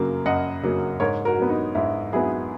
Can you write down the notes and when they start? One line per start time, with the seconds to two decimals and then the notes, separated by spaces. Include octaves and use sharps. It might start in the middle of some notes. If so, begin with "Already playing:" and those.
Already playing: F#2 C#3 F#3 A#3
0.26 F#2 D#5 F#5
0.63 C#3 F#3 A#3
1.00 G#2 A#4 C#5
1.25 F#4 A#4
1.38 F#3 B3
1.50 D#4
1.75 G#2 E4
2.12 F#3 B3 E4 G#4